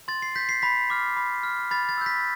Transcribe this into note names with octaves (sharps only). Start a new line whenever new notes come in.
C6 A6
C7
G6 B6
C7
B5 B6
D6 F6
B5
F6
B5 A6
A6
E6 G6
B6